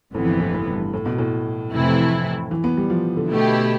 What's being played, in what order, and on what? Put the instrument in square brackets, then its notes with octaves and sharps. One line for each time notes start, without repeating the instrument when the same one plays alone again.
[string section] G1 F2 C3 E3 B3 [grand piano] A2
[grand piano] A2
A2
G2
A2
B2
A2
[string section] F2 C3 E3 A3 E4
[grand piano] E3
B3
G3
F3
D3
[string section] B2 A3 E4 G4